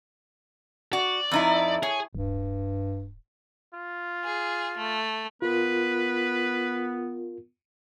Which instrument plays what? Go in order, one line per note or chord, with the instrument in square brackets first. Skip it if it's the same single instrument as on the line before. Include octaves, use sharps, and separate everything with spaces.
[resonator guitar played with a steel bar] F#4 [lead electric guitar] D5
[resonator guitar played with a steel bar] F2 D#4 E4
[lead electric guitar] G#4 [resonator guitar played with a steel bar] C#5
[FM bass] D1 [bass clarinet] G2
[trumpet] F4
[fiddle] G#4
A3
[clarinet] B3 [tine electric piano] F4 A#4 [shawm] B4